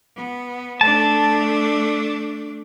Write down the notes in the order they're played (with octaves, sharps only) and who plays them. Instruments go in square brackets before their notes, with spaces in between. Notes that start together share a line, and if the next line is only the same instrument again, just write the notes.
[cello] B3
[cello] A3 D4 [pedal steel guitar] A5